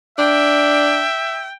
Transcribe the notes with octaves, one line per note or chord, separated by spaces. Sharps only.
D4 E5 G5